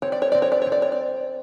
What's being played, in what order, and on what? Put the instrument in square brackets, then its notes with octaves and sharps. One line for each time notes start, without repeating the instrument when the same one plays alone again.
[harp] C4 [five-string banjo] C#5
[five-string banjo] D5
C#5
[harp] C4 [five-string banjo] D5
[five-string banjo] C#5
D5
[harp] C4 [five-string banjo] C#5
[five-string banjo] D5
C#5
D5